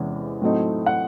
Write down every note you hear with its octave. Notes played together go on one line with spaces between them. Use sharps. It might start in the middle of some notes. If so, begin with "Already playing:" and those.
Already playing: E2 C3 E3 G#3 C#4
A2 F#3 A3 C4 D#4
F#5